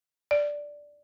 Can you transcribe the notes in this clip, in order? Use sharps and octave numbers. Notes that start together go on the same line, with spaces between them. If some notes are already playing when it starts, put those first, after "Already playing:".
D5